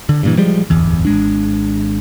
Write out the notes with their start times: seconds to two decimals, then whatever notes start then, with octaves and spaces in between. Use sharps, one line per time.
0.09 D3
0.23 G2 A#2 E3
0.38 F3 G3 G#3
0.70 D1 G1 E2 E3
1.05 G#1 G#3 D4